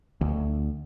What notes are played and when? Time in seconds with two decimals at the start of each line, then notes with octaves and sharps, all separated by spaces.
0.21 D2